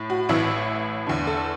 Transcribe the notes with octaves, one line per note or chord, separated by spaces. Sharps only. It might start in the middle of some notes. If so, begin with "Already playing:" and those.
Already playing: A2
F#4
A1 A2 E3 E4
E2 D3
A4